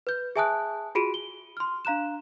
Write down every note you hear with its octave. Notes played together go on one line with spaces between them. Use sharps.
B4 G6
G#4 E5 G#5 A5 D#6 F#6
F4 F#4 G#4 B5 D7 D#7
G7
C6 F6
D4 F5 A#5 F#6 E7